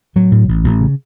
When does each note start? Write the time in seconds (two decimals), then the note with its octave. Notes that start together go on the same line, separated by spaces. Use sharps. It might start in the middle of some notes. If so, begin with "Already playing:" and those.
0.16 A2 F#3
0.31 A2
0.48 A1
0.64 A1
0.81 C#3